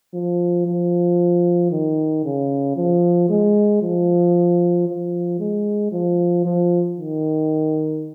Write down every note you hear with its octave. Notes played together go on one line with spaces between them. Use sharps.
F3
F3
D#3
C#3
F3
G#3
F3
F3
G#3
F3
F3
D#3